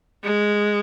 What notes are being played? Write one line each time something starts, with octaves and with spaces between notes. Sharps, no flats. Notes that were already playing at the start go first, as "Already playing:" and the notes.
G#3